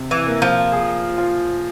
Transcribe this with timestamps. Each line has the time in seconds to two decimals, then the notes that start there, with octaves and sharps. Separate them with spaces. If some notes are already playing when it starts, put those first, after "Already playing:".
Already playing: C3
0.11 E3
0.27 A#3
0.42 F3
0.72 G#4
1.18 F4